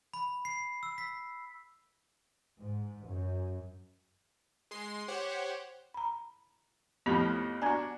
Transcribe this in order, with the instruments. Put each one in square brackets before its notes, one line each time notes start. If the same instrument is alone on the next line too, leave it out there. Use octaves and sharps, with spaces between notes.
[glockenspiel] B5
C7
E6
B6
[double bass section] G#2
F#2
[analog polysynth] G#3 C6 C7
G4 C5 C#5 F#5
[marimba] A#5 B5
[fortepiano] F2 A2 F3 [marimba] B3 G4 B5
[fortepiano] D4 F#4 [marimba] G#5 A#5 G#6